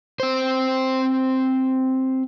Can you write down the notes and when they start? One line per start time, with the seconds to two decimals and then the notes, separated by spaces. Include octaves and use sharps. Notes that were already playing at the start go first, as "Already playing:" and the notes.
0.20 C4 C5